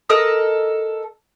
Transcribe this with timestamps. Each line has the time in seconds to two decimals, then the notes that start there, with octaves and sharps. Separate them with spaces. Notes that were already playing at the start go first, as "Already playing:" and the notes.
0.09 A4 A#4 D#5 D#6